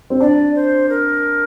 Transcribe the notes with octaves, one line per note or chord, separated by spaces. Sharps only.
C4
D4 D5
C5
A#4